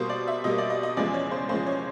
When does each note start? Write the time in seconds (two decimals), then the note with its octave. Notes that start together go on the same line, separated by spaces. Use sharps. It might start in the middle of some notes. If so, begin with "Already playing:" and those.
Already playing: B2 G3 A#3 C5
0.10 D5
0.27 E5
0.44 B2 G3 A#3 D#5
0.58 D5
0.70 D#5
0.83 D#5
0.97 E2 C#3 F3 G#3 D5
1.14 C#5
1.31 C5
1.49 E2 C#3 F3 G#3 C5
1.66 C#5